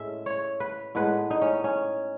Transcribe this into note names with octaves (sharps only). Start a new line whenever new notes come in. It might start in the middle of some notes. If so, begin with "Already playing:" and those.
Already playing: A2 G#3 C#4 E5
C#5
B4
A2 G#3 B3 B4
D#4
C#4
C#4